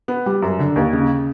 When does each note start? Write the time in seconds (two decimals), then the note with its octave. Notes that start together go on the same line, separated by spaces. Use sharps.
0.08 B3
0.26 G3
0.42 F#2
0.59 D3
0.76 D#2
0.93 C#3